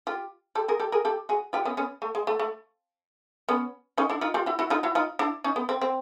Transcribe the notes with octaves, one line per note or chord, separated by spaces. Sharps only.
F4 G4
G4 A4
G#4 A#4
G4 A4
G#4 A#4
G4 A4
F#4 G#4
F4 G4
B3 C#4
B3 C#4
A3
G#3
A3
A3
B3 C#4
C#4 D#4
D4 E4
D#4 F4
F4 G4
E4 F#4
E4 F#4
D#4 F4
E4 F#4
D#4 F4
D4 E4
C#4 D#4
B3
C4
C4